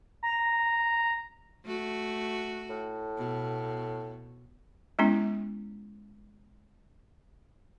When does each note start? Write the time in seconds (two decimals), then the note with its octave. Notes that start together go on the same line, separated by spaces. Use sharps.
0.23 A#5
1.65 A3 F#4
2.69 A2
3.18 B2
4.99 G#3 B3 C#4 E4